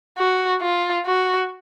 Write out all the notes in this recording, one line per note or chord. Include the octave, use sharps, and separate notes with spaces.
F#4
F4
F#4